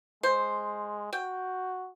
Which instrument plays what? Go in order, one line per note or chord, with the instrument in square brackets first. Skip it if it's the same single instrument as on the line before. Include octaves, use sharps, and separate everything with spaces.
[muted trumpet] G#3 [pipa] C5
[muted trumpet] F#4 [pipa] G5